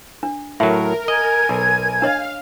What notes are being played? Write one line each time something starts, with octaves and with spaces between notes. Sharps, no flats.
D4
A2 F#3 A#4 E5
D#5 G#5 G#6
B1
D4 C#5 D#5 F5